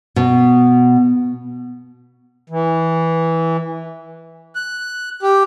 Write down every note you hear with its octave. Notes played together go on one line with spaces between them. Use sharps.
B2
E3
F#6
G4